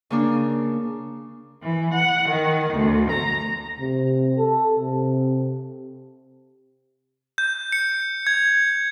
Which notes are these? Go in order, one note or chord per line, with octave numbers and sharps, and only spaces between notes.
C#3 A#3 D4
E3
F#5
D#3
D2
A#5
C3
A4
C3
G6
C#7
G#6